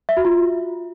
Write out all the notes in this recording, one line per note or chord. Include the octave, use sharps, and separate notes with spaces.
E5
F#4
F4